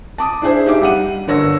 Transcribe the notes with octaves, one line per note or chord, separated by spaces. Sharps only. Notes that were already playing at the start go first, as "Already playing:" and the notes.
A5 D6 D#6
D4 E4 G#4 C5 E5
D#4 G4 E5 F5 D6
G3 F#5 D#7
G1 D3 A#4 C#5 E6 A#6